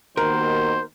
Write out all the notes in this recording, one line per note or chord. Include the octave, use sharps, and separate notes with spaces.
D#2 B2 D#3 A#4 C5